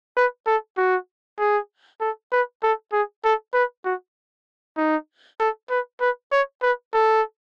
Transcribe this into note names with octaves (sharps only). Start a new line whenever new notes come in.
B4
A4
F#4
G#4
A4
B4
A4
G#4
A4
B4
F#4
D#4
A4
B4
B4
C#5
B4
A4